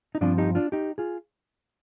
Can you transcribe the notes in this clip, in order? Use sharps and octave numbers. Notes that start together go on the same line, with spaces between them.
D#4
G2 F3 C4 D4 F4
D#4 G4
D4 F4
D#4 G4
F4 G#4